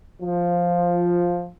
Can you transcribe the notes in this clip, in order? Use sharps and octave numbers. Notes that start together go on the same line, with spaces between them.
F3